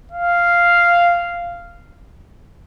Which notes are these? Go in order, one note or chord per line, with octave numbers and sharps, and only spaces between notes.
F5